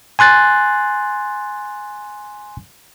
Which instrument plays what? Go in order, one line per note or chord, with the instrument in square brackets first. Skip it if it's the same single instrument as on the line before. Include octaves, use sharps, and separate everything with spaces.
[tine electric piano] G#5 C6 F#6 A6